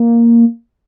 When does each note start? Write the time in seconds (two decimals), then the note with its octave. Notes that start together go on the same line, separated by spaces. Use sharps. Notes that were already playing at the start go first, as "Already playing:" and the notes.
Already playing: A#3